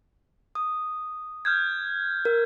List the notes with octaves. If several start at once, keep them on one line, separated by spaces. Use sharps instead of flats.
D#6
F6 G6 G#6
A#4